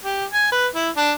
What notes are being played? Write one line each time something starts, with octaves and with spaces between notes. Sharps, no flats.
G4
G#5
B4
E4
D4